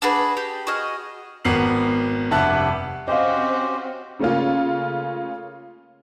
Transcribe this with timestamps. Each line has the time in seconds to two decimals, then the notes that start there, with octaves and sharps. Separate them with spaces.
0.02 D4 F#4 G#4 B4
0.37 G4
0.67 F#4 G#4 D#5 F6
1.45 G#1 B3 A#4 C7 F#7
2.31 F1 G2 E5 F#5 A5 F#6
3.08 C4 C#4 F#4 G4 C5 D#5 F5
4.19 C#3 A3 A#3 C#4 F4